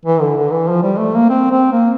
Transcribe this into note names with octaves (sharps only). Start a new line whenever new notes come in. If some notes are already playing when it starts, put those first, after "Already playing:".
E3
D3
D3
E3
F3
G3
A3
A#3
C4
C4
A#3